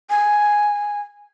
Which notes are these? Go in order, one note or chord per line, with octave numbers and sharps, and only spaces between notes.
G#5